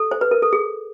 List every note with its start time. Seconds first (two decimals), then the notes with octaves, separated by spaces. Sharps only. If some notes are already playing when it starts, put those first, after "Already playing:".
Already playing: A4
0.11 C5
0.21 B4
0.31 A#4
0.42 A4
0.53 G#4